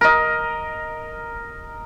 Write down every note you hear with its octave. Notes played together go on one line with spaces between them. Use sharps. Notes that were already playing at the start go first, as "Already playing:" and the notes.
A#4 D#5